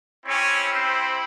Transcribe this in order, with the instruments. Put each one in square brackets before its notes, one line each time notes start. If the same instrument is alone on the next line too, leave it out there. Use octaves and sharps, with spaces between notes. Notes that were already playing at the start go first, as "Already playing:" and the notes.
[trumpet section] C4 C#4 E4 G4 C#5
C4 C5